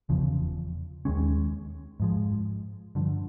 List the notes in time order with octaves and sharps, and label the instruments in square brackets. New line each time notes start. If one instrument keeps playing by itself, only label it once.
[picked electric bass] F1 E2 C#3 F3
D#2 D#3 G#3 C#4
G#2 F3 G#3
G2 D3 F3